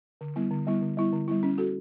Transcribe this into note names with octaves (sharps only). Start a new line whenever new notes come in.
D3
G3 B3 E4
D3
G3 B3 E4
D3
G3 B3 E4
D3
G3 B3 E4
C#4
F#4 A4